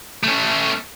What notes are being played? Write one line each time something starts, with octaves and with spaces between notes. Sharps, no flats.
A3 C#4